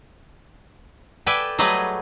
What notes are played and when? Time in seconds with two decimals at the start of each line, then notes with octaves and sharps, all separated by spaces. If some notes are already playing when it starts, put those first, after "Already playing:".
1.26 A4 B4 D5 E5 G5 G#5
1.59 F#3 G3 A3 G#4 B4 D#5